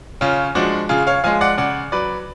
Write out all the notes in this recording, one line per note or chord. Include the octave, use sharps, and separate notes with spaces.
C#3 C#4 F4
F3 G#3 D4 F#4
C#3 F4 G#4
C#5 F5
F3 G#3 F5 G#5
D5 F#5
C#3 D5 F#5
F#3 B4 D5